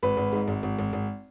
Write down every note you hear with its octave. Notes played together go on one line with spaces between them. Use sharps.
G#1 B4
G#1
G#2
G#1
G#1
G#1
G#1